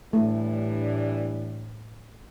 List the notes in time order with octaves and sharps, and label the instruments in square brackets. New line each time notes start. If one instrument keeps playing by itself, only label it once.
[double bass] A2 [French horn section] E3 G3 D4 [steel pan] A3